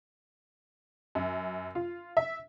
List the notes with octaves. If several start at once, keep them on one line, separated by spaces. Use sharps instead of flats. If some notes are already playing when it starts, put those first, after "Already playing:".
F#2
F4
E5